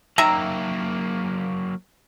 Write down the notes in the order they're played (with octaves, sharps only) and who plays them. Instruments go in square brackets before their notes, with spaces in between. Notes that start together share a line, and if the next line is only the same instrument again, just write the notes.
[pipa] D#3 E5 A#5 [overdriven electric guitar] F#3 A#3